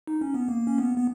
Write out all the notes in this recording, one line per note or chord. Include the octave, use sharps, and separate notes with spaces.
D#4
C#4
B3
A#3
C#4
B3
B3